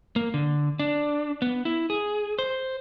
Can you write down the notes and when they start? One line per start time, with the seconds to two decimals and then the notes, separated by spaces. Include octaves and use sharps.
0.16 A#3
0.34 D3
0.79 D4
1.42 B3
1.65 E4
1.90 G#4
2.39 C5